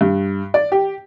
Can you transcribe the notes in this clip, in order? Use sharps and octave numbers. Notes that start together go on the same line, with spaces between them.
G2
D5
G4